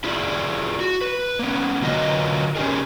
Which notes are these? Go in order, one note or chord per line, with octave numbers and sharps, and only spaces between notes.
E4 F4 G#4 D5
F#4
B4
A#3 B3 C#4
D3 F#3 F4 A#4 B4 D#5
C#4 D#4 G4 G#4 A#4